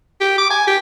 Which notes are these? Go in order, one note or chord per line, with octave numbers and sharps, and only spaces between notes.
G4
D6
G#5
G4